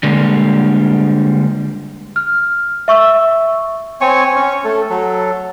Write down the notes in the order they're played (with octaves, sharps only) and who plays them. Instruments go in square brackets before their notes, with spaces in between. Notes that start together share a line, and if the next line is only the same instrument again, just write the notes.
[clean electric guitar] D3 G3 G#3 A#3
[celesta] F6
E5 C#6 E6
[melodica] C4 C#5 G#5 C#6
C#4 C#6
A3 A4
F#3 A4